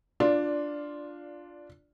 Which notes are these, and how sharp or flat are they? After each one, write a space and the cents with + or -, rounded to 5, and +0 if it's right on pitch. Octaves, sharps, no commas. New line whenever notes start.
D4 +0 F4 +0 D5 -10